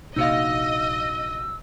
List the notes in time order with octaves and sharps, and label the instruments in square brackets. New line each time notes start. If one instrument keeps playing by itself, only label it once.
[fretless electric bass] A#1 C3 A#3 [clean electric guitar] D#4 F#4 F5 [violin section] D#5 [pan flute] E6